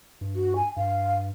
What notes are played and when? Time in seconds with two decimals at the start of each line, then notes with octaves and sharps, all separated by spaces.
0.21 G2
0.36 F#4
0.56 G#5
0.77 G2 F5